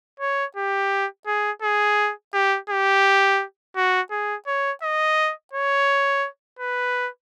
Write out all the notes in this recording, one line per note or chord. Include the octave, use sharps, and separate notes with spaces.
C#5
G4
G#4
G#4
G4
G4
F#4
G#4
C#5
D#5
C#5
B4